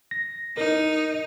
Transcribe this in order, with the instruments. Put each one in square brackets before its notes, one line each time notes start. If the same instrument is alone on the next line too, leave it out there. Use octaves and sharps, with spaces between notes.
[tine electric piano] A#6
[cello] D#4 [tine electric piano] A#4